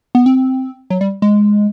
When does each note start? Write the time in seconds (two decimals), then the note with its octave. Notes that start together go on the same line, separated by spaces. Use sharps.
0.15 B3
0.26 C4
0.90 F#3
1.01 G3
1.22 G#3